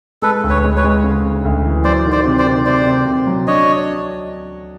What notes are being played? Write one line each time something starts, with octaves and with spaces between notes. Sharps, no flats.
G#3 A4 B4
D2
B4 C#5
G#3
B4 C#5
G#3
C#3
C#3
D2
E3
F#3 C5 D5
D#3
C5 D5
C3
C5 D5
D#3
C3 C5 D5
C3
C3
F#3
D4 C#5 D#5